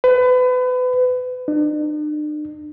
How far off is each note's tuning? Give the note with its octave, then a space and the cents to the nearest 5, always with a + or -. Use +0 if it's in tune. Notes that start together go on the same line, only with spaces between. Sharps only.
B4 +30
D4 +45